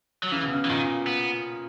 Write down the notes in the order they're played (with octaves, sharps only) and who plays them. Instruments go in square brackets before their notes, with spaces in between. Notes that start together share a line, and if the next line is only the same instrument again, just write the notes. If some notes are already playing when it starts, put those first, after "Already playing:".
[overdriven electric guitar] F#3
[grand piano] C#3 [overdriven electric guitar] E3
[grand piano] B2
C#3
[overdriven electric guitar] E3
[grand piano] A#2 [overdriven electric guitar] D#3
[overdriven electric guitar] B3